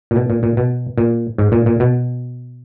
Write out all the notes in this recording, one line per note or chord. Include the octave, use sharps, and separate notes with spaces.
A#2
B2
A#2
A#2
B2
A#2
G#2
A#2
A#2
B2